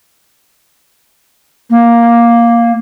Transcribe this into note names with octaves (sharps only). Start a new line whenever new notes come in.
A#3